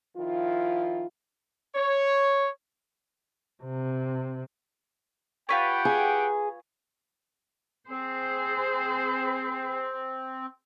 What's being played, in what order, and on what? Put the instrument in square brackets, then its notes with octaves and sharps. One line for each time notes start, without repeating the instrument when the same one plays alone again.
[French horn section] D#3 F3 E4 F4
[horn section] C#5
[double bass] C3
[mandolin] F4 B4 C#5 [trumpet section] G4 F#5 G5
[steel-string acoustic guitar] G#4
[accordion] C4 [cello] G#4 C5